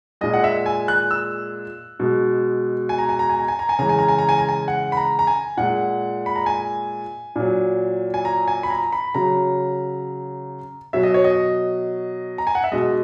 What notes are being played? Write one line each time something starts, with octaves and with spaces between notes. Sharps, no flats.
A#2 G#3 D#5
F#5
E5
G#5
F#6
E6
B2 G#3
G#5
A#5
G#5
A#5
G#5
A#5
G#5
A#5
G#5
C#3 E3 G#3 A#5
G#5
A#5
G#5
A#5
G#5
A#5
G#5
F#5
B5
A#5
A#5
G#5
A#2 G#3 F#5
B5
A#5
G#5
A#2 F#3
G#5
A#5
G#5
B5
A#5
B5
C#3 F#3 A#5
B2 F#3 E5
D#5
C#5
D#5
A#5
G#5
F#5
E5
B2 G#3 D#5